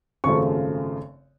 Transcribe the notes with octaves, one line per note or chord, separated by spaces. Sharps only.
G#1 F#2 C#3 F3 A3 C#6